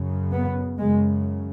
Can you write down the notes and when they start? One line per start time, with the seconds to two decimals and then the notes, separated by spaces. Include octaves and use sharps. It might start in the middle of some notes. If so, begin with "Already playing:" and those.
Already playing: F#2 C#3
0.34 B3
0.78 F#2 C#3 G#3